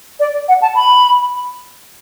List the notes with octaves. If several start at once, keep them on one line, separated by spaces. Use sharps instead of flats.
D5
F#5
A5
B5